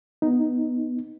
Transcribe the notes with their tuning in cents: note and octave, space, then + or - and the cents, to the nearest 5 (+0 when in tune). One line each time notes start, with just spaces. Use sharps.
B3 +0 D#4 +0